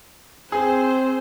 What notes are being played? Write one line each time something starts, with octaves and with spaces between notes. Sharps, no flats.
C4 G#4 C5